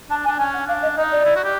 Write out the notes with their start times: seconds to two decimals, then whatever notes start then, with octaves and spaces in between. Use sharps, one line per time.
0.10 D4 A5
0.24 G#5
0.27 D4
0.39 C#4 G#5
0.54 F#5
0.67 D4 F5
0.82 D#5
0.97 D#4 D#5
1.12 D5
1.25 E4
1.36 F#4
1.44 G4